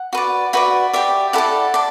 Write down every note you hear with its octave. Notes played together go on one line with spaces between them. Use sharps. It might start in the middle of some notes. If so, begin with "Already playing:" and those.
Already playing: F#5
F#4 B4 D5
F#4 B4 D5 E5
G4 D5 E5
E4 A4 D5 F#5
A4 D5